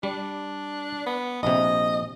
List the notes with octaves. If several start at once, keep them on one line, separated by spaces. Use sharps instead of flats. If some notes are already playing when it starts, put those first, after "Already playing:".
G3 D4
B3
A#1 C3 D#5